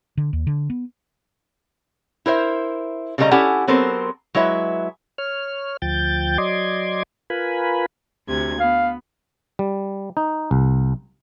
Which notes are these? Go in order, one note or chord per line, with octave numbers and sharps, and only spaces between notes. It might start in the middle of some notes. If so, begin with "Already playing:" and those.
D3
D#2
D3
B3
E4 A#4 C5 E5
C#3 G3 A3 A4 D#5 A#5
C#4 E4 G4 A4 F#5 G#5
F#3 B3 C4 A4 A#4 C5
F#3 G#3 E4 B4 E5
C#5 F6
D2 F3 G5 G6 A6
F#3 D5 D#5 C6 D6 G#6
F4 A#4 B4 G#5 B5
D2 C3 G#6
B3 F5
G3
D#4
C2